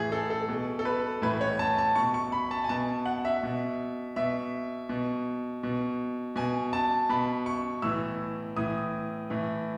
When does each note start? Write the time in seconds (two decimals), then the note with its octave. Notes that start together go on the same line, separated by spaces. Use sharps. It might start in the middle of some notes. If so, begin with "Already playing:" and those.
Already playing: A2 E3 G#4
0.12 A4
0.30 A4
0.49 B2
0.79 A4
0.85 B4
1.22 A2 E3 B4
1.41 C#5
1.59 A5
1.78 A5
1.95 B2 C#6
2.14 C#6
2.32 B5
2.51 A5
2.64 G#5
2.69 B2 A5
3.06 F#5
3.25 E5
3.43 B2
4.16 B2 E5
4.89 B2
5.63 B2
6.36 B2 G#5
6.73 A5
7.09 B2 B5
7.46 C#6
7.82 A2 E3 E6
8.56 A2 E3 D#6
9.30 A2 E3